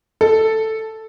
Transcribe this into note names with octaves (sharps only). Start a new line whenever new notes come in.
A4